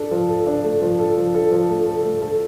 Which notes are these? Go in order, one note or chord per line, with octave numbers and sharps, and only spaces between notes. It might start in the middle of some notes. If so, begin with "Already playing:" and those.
Already playing: D4 A4
F3
A4
D4
A3
F3
A4
F3
A4
F3
A3
A4
A3
A4